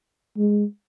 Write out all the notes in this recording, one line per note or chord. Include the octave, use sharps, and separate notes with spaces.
G#3